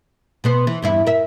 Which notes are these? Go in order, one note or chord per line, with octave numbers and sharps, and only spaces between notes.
B2 B3 C5
E3
E2 G2 E4
A#4 E5